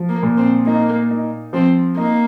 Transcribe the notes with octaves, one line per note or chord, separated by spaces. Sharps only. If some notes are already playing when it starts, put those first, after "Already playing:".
Already playing: F3
A#3
A#2
C4
A#3 D#4
D#4
F3 C4
A#3 D#4